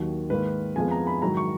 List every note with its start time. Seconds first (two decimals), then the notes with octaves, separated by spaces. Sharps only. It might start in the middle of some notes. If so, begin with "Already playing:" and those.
Already playing: D#2 D#3 F#3
0.30 G#2 D#3 A#3 B4
0.76 F2 F3 G#3 B3 G#5
0.91 A#5
1.07 B5
1.22 G#2 D#3 F#3 A#5
1.37 C#6